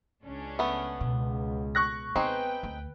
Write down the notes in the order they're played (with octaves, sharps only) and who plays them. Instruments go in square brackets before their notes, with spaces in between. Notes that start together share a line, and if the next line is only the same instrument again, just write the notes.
[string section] C#2 C#4 D4
[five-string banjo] A3 B3
[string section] C#2 [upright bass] B2
[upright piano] C#6 F#6 A#6
[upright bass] B3 [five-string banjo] C4 D#4 G#4 [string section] B4 G5
[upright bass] D2